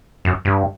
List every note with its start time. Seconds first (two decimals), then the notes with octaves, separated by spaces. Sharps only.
0.25 F#2
0.45 G2